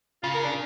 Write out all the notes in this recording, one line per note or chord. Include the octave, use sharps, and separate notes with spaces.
C#3 F4
A#4
D4